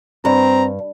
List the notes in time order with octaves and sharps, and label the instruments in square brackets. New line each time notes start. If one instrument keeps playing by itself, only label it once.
[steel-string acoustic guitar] G2 [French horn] C4 [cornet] A#5